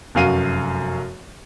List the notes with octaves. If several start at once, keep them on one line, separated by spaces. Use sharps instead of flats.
F1 F#2 F#4 F5 D#7